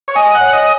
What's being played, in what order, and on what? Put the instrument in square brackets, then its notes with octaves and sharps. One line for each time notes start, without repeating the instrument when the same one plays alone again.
[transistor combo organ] C#5
[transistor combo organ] D#5 [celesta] G#5
[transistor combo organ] F#5
[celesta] C#5
[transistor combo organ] D#5